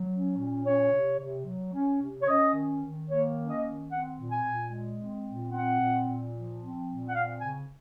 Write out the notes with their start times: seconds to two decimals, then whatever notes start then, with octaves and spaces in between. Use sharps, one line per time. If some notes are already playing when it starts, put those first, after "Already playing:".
Already playing: F#3
0.12 C#4
0.38 A#2
0.65 C#4 C#5
0.92 C3
1.20 C3
1.46 F#3
1.73 C#4
2.01 C3
2.21 C#5
2.27 C#4 D#5
2.54 D#3
2.82 D#3
3.09 A#3 C#5
3.36 C#4
3.49 D#5
3.63 D#3
3.90 C4 F#5
4.17 A#2
4.31 G#5
4.44 A#2
4.71 G#3
4.97 C4
5.26 A#2
5.52 C4 F#5
5.80 A#2
6.06 A#2
6.33 F3
6.60 C4
6.87 A#2
7.09 F#5
7.14 C4 F5
7.41 C#3 G#5